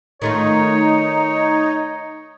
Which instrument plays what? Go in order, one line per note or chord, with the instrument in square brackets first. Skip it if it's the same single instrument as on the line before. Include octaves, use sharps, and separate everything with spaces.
[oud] D#3 A3 F4 [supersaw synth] D#4 [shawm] C#5